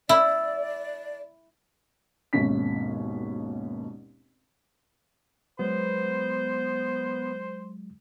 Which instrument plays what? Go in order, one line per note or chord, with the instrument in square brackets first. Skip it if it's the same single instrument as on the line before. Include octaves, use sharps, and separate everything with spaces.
[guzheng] E4 [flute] D5
[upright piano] G#1 D#2 B2 C#4 B6
[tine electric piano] F#3 G#3 [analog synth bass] B3 [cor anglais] C5